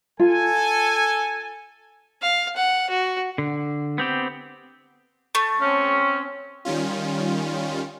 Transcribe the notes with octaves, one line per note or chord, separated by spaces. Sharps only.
F4 A4 G#5
F5
F#5
F#4
D3
B3 C4 G4
A3
C4 C#4
D#3 G3 C#4 F4